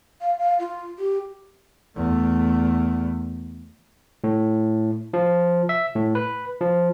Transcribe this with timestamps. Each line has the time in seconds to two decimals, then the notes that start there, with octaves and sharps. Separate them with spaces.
0.21 F5
0.39 F5
0.59 F4
0.99 G4
1.96 E2 A3
4.24 A2
5.14 F3
5.69 E5
5.95 A2
6.15 B4
6.61 F3